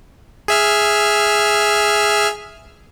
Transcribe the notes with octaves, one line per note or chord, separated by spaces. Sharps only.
G#4 E5 F6